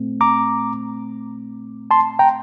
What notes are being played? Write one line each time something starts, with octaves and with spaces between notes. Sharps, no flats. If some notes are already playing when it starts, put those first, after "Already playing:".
Already playing: A#2 A3 C4
A#5 D6
A5 C6
G5 A#5